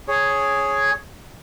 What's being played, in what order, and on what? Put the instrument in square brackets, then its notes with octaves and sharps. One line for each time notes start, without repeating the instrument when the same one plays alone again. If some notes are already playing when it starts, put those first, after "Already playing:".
[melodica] G#4 C#5